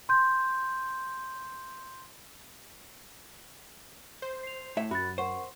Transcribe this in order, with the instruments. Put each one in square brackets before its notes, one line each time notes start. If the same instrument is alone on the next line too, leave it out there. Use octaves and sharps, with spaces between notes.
[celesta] C6 G6
[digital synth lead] C5
[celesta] C7 F7
[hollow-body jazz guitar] A2 E5
[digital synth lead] F#2 [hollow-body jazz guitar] F#4 [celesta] B5 F#6 A6
[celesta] A#4 F#5 C#6 [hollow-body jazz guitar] C5